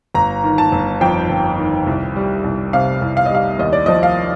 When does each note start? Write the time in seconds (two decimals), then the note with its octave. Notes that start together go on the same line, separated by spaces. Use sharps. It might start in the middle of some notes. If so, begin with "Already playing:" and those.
0.15 G1 A#5
0.44 D#3
0.58 A5
0.72 G1
1.01 F2 G5
1.30 G1
1.58 D#3
1.86 C2
2.16 G3
2.44 C2
2.73 C3 F5
3.01 C2
3.17 F5
3.26 D#5
3.31 G3 F5
3.59 D#2 D#5
3.73 D5
3.86 F3 D#5
4.03 F5